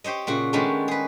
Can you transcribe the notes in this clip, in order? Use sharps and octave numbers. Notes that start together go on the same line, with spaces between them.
G4 C5 C#5 D#5
A#2 C#3 F#4
D#3 G#3 A3 B3 C#4 D4
G#4 B4